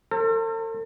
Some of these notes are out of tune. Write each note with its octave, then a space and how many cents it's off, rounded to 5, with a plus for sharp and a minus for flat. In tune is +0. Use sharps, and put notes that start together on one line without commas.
A4 +45 C5 +35